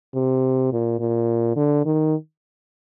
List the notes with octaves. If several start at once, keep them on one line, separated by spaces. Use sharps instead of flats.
C3
A#2
A#2
D3
D#3